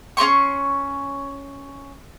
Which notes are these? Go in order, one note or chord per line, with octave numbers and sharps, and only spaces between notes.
C#4 G4 C6 C#6